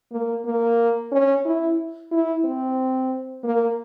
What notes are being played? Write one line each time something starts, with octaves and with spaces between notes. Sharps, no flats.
A#3
A#3
C#4
E4
E4
C4
A#3